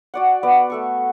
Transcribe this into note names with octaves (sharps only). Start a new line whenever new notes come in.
F#4 D5 F#5
B3 B4 D5
A3 A4 C#6